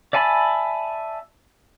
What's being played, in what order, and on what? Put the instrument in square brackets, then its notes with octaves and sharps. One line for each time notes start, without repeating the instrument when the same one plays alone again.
[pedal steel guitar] D5 E5 G#5 A5 B5